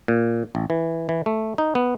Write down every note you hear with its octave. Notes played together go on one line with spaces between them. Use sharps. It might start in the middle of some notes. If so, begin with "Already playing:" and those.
A#2
A1
E3
E3
A3
D#4
B3